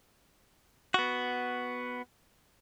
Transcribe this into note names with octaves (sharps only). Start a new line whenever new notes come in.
B3 F#4